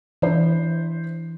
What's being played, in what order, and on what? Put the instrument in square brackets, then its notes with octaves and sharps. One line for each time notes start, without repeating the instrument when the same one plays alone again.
[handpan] E3 D4 [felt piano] E4 C5